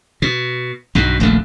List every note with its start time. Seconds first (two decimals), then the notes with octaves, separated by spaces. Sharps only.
0.22 B2
0.95 B1 G2 B2
1.20 D#1 A#1 F2 A3